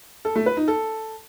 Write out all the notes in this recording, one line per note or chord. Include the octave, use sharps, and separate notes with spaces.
A4
A3
B4
D#4
A4